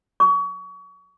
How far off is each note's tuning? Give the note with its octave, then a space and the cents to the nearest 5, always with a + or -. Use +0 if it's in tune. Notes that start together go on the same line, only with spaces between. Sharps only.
C#6 +35